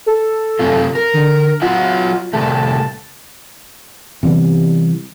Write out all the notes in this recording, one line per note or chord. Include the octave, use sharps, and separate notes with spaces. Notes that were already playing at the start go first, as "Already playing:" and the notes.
A4
F#2 C3 F4
A#4
D3
F#3 F4 D#5 F#5
C3 G3 A3 A5
C3 E3 G3 B3